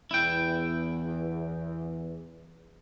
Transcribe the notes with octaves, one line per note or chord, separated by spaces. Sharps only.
E2 E4 G5